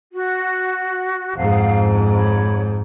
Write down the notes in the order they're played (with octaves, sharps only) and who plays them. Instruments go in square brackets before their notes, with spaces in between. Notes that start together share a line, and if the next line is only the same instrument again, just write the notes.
[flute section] F#4
[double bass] F2 G#2 [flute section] F5 F#5
[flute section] C#5 B5